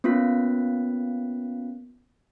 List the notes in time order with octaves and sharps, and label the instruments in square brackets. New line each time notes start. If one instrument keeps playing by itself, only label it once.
[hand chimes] A#3 B3 C#4 F4 F#6 B6